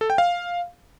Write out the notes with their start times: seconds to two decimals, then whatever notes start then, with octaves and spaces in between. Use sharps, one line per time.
0.01 A4
0.10 G5
0.18 F5